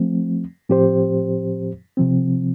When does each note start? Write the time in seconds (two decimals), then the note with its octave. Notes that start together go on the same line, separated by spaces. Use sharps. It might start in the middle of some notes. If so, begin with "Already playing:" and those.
Already playing: F3 A3 C4
0.69 A2 F3 C4 G4 C5
1.97 C3 F3 C4